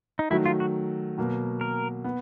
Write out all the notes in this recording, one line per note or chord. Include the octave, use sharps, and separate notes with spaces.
D#4
D#3 F#3 A3 E4
F4
F#4
B2 F#3 A#3
A#4
B3